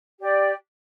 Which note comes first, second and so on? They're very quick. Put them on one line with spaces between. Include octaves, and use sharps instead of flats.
G4 D5 G5